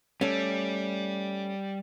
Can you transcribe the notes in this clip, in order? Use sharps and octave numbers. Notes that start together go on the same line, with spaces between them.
G3 A3 C#4